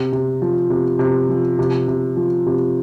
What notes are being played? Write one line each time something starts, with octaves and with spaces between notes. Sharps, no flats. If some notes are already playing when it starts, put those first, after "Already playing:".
Already playing: C3
C3
F3
C3
C3
F3
C3
C3
F3
C3